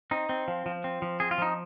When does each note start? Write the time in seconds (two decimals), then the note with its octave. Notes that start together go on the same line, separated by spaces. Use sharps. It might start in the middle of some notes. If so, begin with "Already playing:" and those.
0.11 C4 D#4
0.29 C4
0.48 F3
0.66 F3
0.84 C4
1.02 F3
1.20 C4 G#4
1.31 F4
1.38 F3 D#4